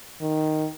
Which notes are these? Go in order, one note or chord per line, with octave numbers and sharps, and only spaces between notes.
D#3